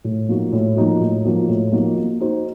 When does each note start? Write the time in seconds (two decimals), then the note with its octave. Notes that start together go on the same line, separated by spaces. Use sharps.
0.04 A2
0.29 F3 A#3 D#4 F#4
0.52 A2
0.76 F3 A#3 D#4 F#4
1.01 A2
1.24 F3 A#3 D#4 F#4
1.48 A2
1.72 F3 A#3 D#4 F#4
1.97 A#3
2.20 D#4 F#4 C5